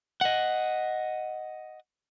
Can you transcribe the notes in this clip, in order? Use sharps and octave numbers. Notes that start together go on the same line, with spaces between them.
D#5 F#5